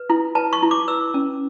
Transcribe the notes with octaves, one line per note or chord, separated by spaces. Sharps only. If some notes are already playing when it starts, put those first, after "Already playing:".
Already playing: B4
E4
B4 A5
C#6
E4
D6
B4 E6
C#4